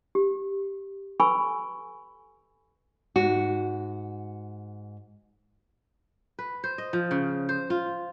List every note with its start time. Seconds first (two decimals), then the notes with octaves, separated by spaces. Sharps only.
0.15 G4
1.20 A4 B4 G#5 B5 C#6 E6
3.16 G#2 F#4
6.39 B4
6.64 C5
6.78 D#5
6.93 F3
7.11 C#3
7.49 C5
7.70 F4